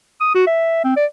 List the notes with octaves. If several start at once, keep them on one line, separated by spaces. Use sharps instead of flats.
D#6
F#4
E5
C4
D5